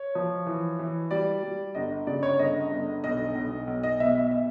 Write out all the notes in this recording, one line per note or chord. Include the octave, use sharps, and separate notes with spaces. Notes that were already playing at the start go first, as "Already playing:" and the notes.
Already playing: C#5
F3
E3
E3
G3 D5
G3
G1 D#5
C#3 D5
C#5
G1 D#5
G1
B1 D#5
B1
B1
D#5
B2 E5
E5
E5